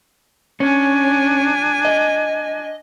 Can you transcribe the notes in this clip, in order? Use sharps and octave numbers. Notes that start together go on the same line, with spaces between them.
C#4 D4 G#5
D#5